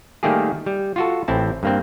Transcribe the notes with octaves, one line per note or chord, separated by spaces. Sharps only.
D#3 G3 A3 A#3 G4 G#4
G3
F4 F#4 A4
A1 C4 E4 A5
G2 A#3 C4